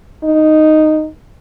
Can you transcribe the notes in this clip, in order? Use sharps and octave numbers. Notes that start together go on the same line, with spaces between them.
D#4